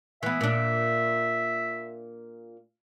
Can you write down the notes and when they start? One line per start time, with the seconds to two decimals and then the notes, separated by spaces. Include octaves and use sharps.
0.23 E3 B3 E5
0.41 A#2 D4